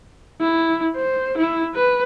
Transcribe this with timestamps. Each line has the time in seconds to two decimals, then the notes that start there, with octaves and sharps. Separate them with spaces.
0.41 E4
0.96 C5
1.38 E4
1.75 B4